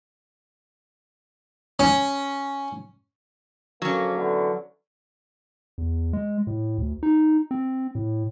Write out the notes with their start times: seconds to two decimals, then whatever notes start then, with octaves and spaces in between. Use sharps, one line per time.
1.79 C#4
3.82 A#1 D3 F#3 A#3 C#4
4.17 D3 E3 B3
5.78 E2
6.13 G#3
6.47 A2
6.78 D2
7.03 D#4
7.51 C4
7.95 A2